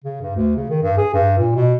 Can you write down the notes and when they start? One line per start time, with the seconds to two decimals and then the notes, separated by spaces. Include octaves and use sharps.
0.04 C#3
0.21 G2
0.37 D2
0.57 C#3
0.70 D#3
0.83 G2
0.98 G#4
1.14 G2
1.38 A#2
1.55 B2